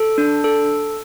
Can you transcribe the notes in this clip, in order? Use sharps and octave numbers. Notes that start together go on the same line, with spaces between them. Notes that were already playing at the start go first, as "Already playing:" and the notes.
Already playing: A4
D4
A4